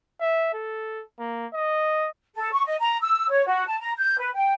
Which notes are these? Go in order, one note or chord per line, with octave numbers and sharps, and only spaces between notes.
E5
A4
A#3
D#5
A4
C#6
D#5
A#5
E6
C#5
F#4
A5
A#5
G6
B4
G5